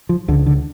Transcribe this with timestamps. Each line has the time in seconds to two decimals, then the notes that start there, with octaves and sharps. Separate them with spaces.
0.09 F3
0.28 C#2 D3
0.46 D3